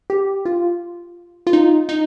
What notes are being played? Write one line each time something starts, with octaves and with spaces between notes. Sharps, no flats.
G4
F4
F4
D#4
D#4